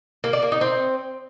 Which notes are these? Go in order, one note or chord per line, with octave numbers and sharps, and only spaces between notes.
A#3
D5
A#3
D#4
C4